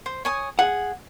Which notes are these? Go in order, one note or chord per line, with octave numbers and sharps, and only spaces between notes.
C5
C#5 G#5 D#6
G#4 F#5